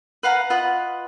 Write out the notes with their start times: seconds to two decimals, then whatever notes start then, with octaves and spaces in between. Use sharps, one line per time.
0.23 B4 F5 F#5 A#5
0.50 F4 B4 D#5 F#5